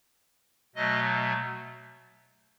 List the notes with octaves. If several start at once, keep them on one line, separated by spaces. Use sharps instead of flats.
B2 F#3 A3 D#5